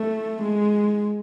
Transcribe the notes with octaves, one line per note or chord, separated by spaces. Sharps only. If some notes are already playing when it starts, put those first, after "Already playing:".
Already playing: A3
G#3